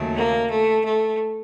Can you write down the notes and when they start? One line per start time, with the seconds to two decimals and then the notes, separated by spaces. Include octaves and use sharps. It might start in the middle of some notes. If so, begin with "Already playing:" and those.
Already playing: D#2 C#3 F#3 A3
0.16 A#3
0.50 A3
0.85 A3